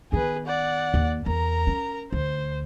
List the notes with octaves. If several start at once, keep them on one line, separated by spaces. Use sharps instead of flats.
D#3 B3 G#4 B4
D5 F#5
D#2
E2 A#4 A#5
C#4
D2 C5